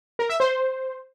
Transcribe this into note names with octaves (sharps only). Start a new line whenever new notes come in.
A#4
E5
C5